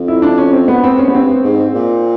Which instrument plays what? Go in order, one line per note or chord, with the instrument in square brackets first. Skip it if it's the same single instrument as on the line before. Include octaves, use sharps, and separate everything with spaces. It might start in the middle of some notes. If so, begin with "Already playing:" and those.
Already playing: [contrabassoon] F2
[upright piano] E4
D4
C#4
C4
B3
C4
C#4
B3
[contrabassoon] G2 [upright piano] C4
[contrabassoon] G#2
A#2